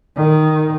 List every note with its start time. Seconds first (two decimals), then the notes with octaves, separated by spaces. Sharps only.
0.17 D#3